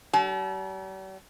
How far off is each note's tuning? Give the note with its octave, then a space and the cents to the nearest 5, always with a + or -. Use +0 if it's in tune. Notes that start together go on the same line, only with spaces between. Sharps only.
G3 -45 A5 -35